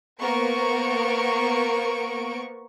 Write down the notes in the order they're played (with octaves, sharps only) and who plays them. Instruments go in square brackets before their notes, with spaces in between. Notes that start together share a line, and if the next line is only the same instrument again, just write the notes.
[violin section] A#3 B3 A#4 C5 C#6 D7